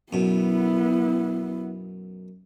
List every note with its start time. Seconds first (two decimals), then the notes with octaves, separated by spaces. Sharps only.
0.13 F#2 B2 B3 E4